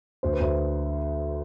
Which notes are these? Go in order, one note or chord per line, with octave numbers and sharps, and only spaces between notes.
D2 C5
B4
D2 C5